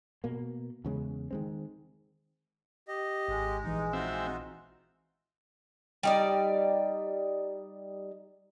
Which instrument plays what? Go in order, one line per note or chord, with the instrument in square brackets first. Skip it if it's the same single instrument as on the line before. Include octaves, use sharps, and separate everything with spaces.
[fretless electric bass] B2 A#3
E2 C#3 G#3
D#3 G#3 C4
[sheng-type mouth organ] G4 D#5
[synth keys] G#1 [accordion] G#3
[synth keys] A#1 E3 [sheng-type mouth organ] D#4
[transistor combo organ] C4 E5 [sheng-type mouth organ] D#4 F4 F#4
[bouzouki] G3 D#4 D5